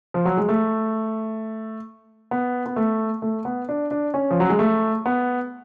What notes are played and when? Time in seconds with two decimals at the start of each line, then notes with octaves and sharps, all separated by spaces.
0.14 F3
0.25 F#3
0.37 G#3
0.49 A3
2.31 B3
2.66 B3
2.76 A3
3.22 A3
3.45 B3
3.69 D4
3.91 D4
4.14 C#4
4.31 F3
4.40 F#3
4.50 G#3
4.59 A3
5.06 B3